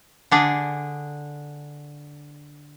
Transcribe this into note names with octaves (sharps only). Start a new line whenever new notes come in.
D3 D4 G#4